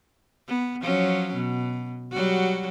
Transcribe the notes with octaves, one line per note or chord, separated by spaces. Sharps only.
B3
F3 F#3 C#4
B2
F#3 G3 F#4